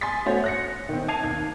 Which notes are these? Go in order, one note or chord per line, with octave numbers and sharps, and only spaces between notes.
G#5 C6 D#6 A6 B6
A3 F#4 C5 C#5
F#6 A#6 C#7
D#3 C4
A5 G#6 C7 D#7 F7
D#2